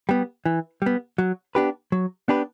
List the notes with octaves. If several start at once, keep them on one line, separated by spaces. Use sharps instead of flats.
G3 B3
E3
G3 B3
F#3
B3 D4 G4 B4
F#3
B3 D4 G4 B4